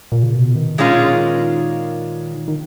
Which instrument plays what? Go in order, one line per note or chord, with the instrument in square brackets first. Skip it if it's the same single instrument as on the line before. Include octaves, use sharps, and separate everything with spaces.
[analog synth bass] A#2
C#3
B2
D#3
[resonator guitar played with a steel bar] A#2 G#3 C#4 F4
[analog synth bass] D#3